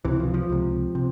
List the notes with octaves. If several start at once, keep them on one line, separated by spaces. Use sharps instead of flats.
C#2 C3 E3
F3
F3
C#2 C3
C3